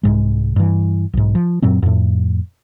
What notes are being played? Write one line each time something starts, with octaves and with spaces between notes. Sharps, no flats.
C2 G#2 G#3
G2 E3
B1 G#2
F3
F#2 A#2 F#3 C4
F2 A2